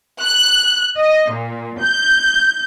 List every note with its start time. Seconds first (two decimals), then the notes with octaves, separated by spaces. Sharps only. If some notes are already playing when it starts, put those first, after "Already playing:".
0.21 F#6
0.97 D#5
1.32 A#2
1.81 G6